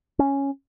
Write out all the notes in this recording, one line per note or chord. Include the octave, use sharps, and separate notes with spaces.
C#4